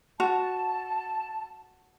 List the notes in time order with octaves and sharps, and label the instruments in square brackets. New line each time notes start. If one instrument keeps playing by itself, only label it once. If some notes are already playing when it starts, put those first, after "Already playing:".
[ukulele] F#4 [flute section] A5